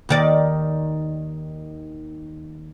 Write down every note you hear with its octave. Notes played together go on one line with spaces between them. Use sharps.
D#2 D#3 D5